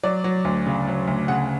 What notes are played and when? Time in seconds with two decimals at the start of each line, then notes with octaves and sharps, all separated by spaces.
0.03 F#3 D5
0.24 F#3
0.45 D2
0.66 C#3
0.87 F#3
1.07 D2
1.28 C#3 F#5